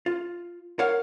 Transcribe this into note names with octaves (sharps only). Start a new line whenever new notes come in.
F4
A#4 C#5 F5 F#5